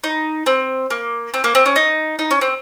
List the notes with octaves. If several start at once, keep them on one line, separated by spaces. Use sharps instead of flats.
D#4
C4
A#3
C4
A#3
C4
C#4
D#4
D#4
C#4
C4